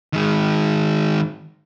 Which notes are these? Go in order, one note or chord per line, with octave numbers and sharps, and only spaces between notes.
D#3 G#3